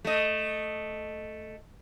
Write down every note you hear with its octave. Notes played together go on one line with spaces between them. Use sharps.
A3 D#5